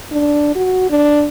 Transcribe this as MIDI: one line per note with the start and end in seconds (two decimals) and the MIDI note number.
0.11 0.52 62
0.55 0.90 66
0.90 1.27 62